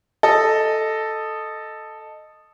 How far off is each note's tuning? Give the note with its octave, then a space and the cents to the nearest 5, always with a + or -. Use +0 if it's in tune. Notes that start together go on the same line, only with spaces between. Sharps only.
A4 +0 D#5 -10